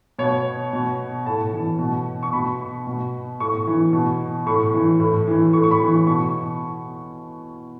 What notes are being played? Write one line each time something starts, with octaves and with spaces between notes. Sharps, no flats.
B2 C#5
B2
A2 A5
E3
B2
C#6
B2 B5
B2
A2 C#6
E3
B2
A2 C#6
E3
A2
E3
A2 C#6
C#6
B5
E3
B2 C#6